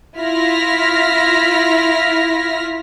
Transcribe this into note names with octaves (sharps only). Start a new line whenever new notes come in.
E4 F4 F6 A#6 B6